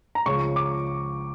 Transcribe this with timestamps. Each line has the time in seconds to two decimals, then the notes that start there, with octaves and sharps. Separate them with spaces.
0.15 A#5
0.26 C#2 C#3 F3 C#6
0.56 D6